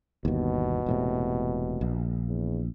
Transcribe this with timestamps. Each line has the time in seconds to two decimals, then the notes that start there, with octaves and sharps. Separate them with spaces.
0.25 G1 D#2 B2
0.86 E1 A2 C3
1.81 A#1
2.27 E2